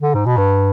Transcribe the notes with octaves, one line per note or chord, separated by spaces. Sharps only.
D3
G#2
B2
G2